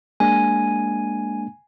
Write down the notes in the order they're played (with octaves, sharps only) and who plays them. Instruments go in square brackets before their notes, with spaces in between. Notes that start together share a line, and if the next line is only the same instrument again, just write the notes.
[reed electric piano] G#3 A#3 D4 [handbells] G#5